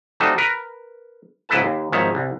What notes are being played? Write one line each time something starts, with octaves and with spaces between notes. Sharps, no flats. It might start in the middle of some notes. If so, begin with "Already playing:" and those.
G3 A3 C4 D#4 F#4 A4
A#4 B4
C#2 G#2 E4 A4 B4 A5
D#2
G#1 D#3 F3 C#5 E5
C2